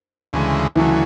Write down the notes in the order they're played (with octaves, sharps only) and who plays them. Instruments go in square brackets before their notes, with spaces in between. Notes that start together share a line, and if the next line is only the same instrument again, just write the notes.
[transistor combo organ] D2 C#3 E3 G#3
[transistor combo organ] D2 C#3 F#3 A3 [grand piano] E3